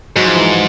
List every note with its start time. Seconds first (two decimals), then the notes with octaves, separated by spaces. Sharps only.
0.16 G#2 F#3 F#4
0.26 F3 F4
0.36 E3 E4